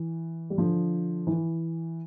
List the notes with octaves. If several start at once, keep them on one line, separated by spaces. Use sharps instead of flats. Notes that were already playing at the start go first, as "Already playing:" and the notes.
Already playing: E3
G3
D3 F3
E3